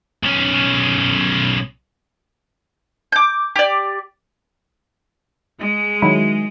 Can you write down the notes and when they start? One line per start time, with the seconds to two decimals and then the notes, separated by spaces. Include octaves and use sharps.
0.23 B1 C#4
3.12 D6 G6
3.56 G4 D5
5.60 G#3
6.02 D#3 F#3 E4